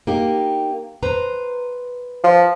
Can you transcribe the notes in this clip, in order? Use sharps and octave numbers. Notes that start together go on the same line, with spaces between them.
A#3 D#4 G4
B4 C5 A#5
F3